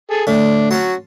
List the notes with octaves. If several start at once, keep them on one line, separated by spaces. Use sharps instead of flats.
G#4 A4
A2 D3 D4
F#3 C#4 F#4 A5 C6